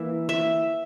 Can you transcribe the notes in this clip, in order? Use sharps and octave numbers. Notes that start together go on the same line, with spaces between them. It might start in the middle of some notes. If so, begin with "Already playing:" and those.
Already playing: E3 A#3 E5
E5